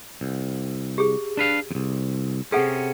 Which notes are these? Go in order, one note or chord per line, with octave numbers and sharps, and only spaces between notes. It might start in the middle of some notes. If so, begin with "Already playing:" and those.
C2
G4 G#4
D4 B4 F5
C2 F2
C3 C#4 G#4 A4 F#5